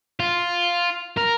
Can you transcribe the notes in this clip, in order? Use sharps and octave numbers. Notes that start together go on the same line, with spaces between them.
F4
A#4